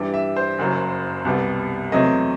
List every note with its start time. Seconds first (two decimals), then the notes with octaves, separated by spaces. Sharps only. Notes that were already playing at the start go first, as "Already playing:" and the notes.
Already playing: G2 E3 G3
0.14 E5
0.36 C5
0.58 F#1 F#2 F#3
1.25 C2 B2 G3 B3
1.92 E2 C3 F#3 A3 C4 D#5